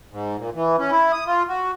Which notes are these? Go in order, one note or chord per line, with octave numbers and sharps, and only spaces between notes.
G#2
A#2
E3
C#4
E4
D#6
F4
F#4